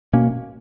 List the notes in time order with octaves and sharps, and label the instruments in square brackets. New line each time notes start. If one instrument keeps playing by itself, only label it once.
[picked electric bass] B2 A#3 C#4